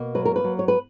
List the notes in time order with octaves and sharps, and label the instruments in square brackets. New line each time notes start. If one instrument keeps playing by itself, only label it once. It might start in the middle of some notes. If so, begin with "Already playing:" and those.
Already playing: [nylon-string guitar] B2 A#3
F#3 B4
A#4
B4
F#3
C#5
B4